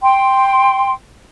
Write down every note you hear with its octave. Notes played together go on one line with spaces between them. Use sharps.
G5 C6